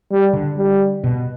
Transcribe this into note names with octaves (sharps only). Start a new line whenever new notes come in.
G3
D3
G3
B2